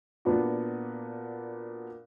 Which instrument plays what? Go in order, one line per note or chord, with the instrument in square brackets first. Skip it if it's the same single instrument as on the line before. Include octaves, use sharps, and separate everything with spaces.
[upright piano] A#2 B3 D4 F#4